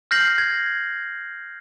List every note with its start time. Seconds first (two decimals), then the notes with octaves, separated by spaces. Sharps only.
0.11 F6 G6 A#6 C7 F#7
0.38 G#6